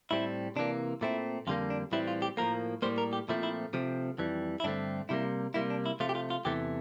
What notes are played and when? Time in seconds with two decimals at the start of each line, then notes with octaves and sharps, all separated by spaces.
0.11 A2 G3 C4 E4
0.56 C3 E3 A#3 D4
1.01 A#2 A3 C4 E4
1.47 F2 D3 G3 A#3 F4
1.70 D4
1.92 A2 E3 G3 C4 E4
2.07 F4
2.22 G4
2.37 A2 F3 A#3 A#4
2.82 A2 G3 A#3 C5
2.98 A#4
3.13 G4
3.29 A#2 F3 A3 C4 E4
3.43 E4
3.73 C3 F3 A3 C4
4.18 F2 E3 G3
4.60 E4
4.64 G2 D3 A3 C4 D4
5.09 C3 G3 A#3 E4
5.54 C3 G3 A#3 E4
5.70 D4
5.86 E4
6.00 C3 F3 A3 F4
6.09 G4
6.15 F4
6.30 F4
6.45 E2 C3 E3 A3 G4